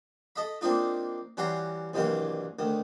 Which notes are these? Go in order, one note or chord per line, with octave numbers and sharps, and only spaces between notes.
A4 D#5 E5 B5
A#3 C4 D4 D#4 F4
E3 G3 C#4 F#4 A#5 C6
C2 G2 D#3 E3 F#3 A#3
D2 D#3